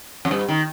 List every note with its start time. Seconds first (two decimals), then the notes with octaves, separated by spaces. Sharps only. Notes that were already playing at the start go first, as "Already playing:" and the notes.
0.25 F2
0.31 G2
0.48 D#3